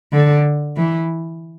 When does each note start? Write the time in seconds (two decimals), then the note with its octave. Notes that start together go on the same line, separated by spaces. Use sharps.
0.13 D3
0.77 E3